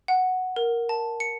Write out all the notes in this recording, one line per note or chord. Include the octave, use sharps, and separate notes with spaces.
F#5
A#4
A5
C#7